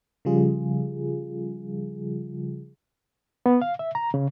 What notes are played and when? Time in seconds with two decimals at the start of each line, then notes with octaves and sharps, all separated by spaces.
0.25 C#3 F3 G3 F4 G#4
3.46 B3
3.62 F5
3.79 E5
3.95 A#5
4.14 C#3